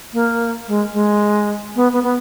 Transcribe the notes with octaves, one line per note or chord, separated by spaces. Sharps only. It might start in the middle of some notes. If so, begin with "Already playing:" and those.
A#3
G#3
G#3
B3
B3
B3